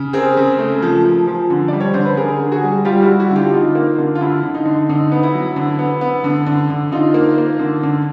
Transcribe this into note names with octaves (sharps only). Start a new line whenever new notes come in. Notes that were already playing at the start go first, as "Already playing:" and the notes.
Already playing: C#3
C4 G#4 A#4
C#3
A3
F3
F3
F3
D3
G3 D5
C#5
D3 C5
B4
D3 G#4 A#4
D3
F#4 G#4
G3
G3 F4 G4
E4 F#4
G3
E4 F#4
D3 F4 G4
D3 D#4 F4
A#3
D3
F4
D3 E4
D3
D#4
D3
D3 D#4
B3
E4
F#3
D3
B3
B3
D3
D3
D3
D3 D#4 F4
A#3
A#3
D3
D3